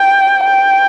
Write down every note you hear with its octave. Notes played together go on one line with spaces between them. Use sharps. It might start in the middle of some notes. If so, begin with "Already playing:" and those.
Already playing: G5
G5